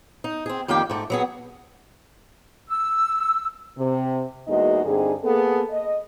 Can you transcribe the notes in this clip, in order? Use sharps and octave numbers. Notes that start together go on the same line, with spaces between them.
D#4
C4 G#4
F2 D#3 A#3 G4 D5 G5
G#2 A3
F#3 B3 G#4
E6
C3
E2 G#3 A#3 D#4 F#4 D#5
G2 D3 C4 D#4 G#4
A#3 B3 G#4 A4
D#5